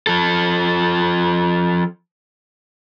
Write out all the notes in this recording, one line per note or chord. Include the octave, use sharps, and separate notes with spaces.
F3 A4